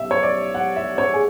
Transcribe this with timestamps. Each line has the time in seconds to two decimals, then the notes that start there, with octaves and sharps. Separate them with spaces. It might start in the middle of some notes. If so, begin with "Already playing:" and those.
Already playing: B1 E5
0.11 C#5
0.23 D5
0.55 F#5
0.76 E5
0.98 C#5
1.14 G#4